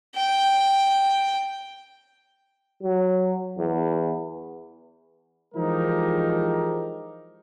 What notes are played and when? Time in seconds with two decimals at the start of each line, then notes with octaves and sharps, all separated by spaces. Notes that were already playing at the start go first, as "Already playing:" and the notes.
0.15 G5
2.83 F#3
3.58 E2
5.55 E3 F3 G#3 D#4 G4 A#4